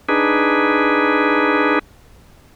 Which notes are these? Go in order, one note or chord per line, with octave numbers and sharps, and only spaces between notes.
D4 D#4 G#4 B4